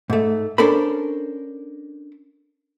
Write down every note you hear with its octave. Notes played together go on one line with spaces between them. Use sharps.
G#2 A3
C#4 D4 A4 A#4 C5 B5